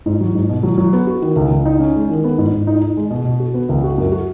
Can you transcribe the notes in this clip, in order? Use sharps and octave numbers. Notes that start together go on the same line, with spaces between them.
G#2
F#3
G#2
B2
F#3
F#3
B3
F#4
D#3
C#2
C#2
D#4
C#4
G#3
D#3
B3
G#2
G#2
D#4
D#4
G#3
B2
B2
F#4
B3
C#2
F#4
F#2
F#4